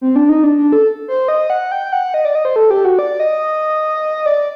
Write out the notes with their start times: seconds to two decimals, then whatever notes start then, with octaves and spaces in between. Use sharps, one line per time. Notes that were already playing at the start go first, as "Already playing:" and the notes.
0.01 C4
0.16 D4
0.29 D#4
0.44 D4
0.58 D4
0.72 A4
1.08 C5
1.28 D#5
1.50 F#5
1.72 G5
1.92 F#5
2.14 D#5
2.25 D5
2.35 D#5
2.45 C5
2.56 A4
2.70 G4
2.85 F#4
2.99 D5
3.20 D#5
4.26 D5